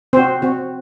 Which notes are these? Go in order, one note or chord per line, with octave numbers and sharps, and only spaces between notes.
C4 F#4 C5
C4 F#4